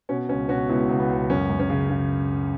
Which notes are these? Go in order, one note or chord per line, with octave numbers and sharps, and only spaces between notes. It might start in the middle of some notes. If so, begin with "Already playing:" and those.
B2 C#4
C#2 C#4
B2 C#4 F#4
C#2 B3 E4
C#2
B3
C#2
F#2 C#4
F#2
C#4
C#3
C#3